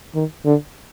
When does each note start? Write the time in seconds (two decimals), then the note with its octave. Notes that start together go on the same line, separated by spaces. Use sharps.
0.15 D#3
0.45 D3